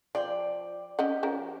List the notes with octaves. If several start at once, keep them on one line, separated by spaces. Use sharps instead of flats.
F3 D5 G5
C#4 G4 D#5 F#5
F3 C#4 A#4